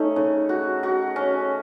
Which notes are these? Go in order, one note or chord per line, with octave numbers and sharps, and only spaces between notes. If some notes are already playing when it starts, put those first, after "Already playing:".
Already playing: A3 C#4 D#4
C#3
F#4
F#4
C#4